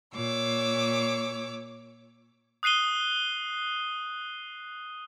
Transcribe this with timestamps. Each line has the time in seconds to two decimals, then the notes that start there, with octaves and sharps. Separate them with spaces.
0.14 A#2 C#5 D6 E6
2.63 D#6 F#6 C7 D#7 G7